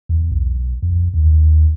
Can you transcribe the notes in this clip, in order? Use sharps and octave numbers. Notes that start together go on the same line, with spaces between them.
E2
B1
F2
D#2